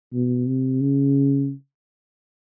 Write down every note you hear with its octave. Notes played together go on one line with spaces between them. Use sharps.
B2
C3
C#3